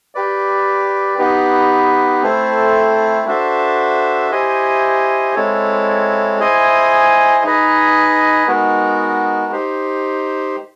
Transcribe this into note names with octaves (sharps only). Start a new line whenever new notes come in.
G4 B4 D5
B3 D#4 G4 B4
A3 C4 E4 A4 C5
D4 F#4 A4 C5 E5
E4 G4 C5 D#5 G#5
G#3 C4 E4 A4 C#5
E4 G#4 C5 D#5 G#5
D#4 G#4 B4 D#5
G#3 B3 D#4 F#4 A#4
D#4 G4 C5